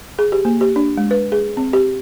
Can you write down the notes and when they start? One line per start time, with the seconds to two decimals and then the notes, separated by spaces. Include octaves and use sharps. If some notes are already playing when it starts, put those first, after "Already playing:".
0.19 G#4
0.32 G4
0.45 A#3
0.61 G4
0.76 D4
0.97 G#3
1.11 B4
1.32 G#4
1.57 C4
1.73 G4